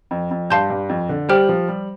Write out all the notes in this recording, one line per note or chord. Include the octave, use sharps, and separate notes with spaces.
F2
F2
G2 F5 A5 C6 G6
G2
F2
D3
G3 G4 C5 G5 F6
F3
G3